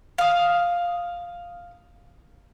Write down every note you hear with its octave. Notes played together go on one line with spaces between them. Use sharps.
F5 D#6